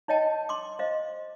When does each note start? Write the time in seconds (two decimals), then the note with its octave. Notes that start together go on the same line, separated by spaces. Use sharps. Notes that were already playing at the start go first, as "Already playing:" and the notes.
0.08 D#4 C#5 D#5 G5 A5
0.49 C6 D6
0.79 C5 D#5 F5